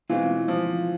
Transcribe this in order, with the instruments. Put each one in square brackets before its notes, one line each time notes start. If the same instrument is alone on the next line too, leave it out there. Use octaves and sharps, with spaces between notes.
[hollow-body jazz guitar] B2 G#3 C4 F4 [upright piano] E3
[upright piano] F3